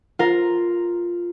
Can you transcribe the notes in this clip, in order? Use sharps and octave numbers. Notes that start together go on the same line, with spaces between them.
F4 A#4